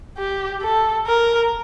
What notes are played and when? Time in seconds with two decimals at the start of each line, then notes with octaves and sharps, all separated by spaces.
0.17 G4
0.62 A4
1.07 A#4